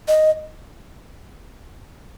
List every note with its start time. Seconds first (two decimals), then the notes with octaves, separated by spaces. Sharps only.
0.08 D#5